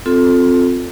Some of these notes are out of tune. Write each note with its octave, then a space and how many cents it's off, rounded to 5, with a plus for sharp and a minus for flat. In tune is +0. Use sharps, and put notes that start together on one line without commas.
C4 +0 F4 +20 A4 +0